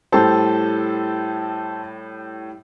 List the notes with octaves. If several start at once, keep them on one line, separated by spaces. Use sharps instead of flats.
A2 G3 A4 C5